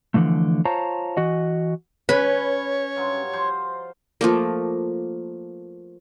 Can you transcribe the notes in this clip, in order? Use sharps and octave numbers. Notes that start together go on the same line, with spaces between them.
D3 E3 F3 A3
F4 C5 C#5 A5 A#5
E3 F#4 D#5
C#4 B4 C#5
G2 F#3 F4
F3 C5 A#5
F3 A3 A#3